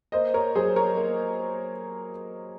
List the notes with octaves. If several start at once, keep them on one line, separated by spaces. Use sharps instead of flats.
A#3 C5 D#5
A#4 C#5
F#3 G#4 C5
A#4 C#5
A#3